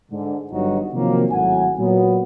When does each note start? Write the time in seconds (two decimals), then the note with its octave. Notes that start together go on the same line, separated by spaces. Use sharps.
0.11 G#2 D3
0.52 G1 G2 D3 F#3 D#4 F#4
0.93 C3 D#3 F3 F#3 A#3
1.32 G#1 A2 F#3 F#5 G#5
1.78 A#2 F#3 B3